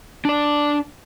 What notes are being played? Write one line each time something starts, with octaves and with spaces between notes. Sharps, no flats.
D4 D5